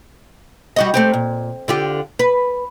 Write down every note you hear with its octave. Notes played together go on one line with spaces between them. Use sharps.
G3 F#4 D#5
A3 C4 G4
A#2
D3 F4 G4
B4